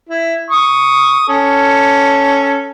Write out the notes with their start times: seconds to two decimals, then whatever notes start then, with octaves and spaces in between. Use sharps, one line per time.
0.09 E4
0.51 C#6 D#6
1.29 C#4 A4